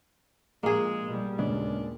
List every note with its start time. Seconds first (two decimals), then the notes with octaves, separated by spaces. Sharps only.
0.63 A#1 A#2 G#3 A#3 G#4
1.09 B2 G3
1.39 D#2 A#2 C#3 G#3 B3 D4